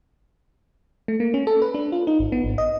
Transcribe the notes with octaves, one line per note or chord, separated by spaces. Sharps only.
A3
A#3
C#4
A4
B4
D4
F4
D#4
G#1
B3
G#1
D#5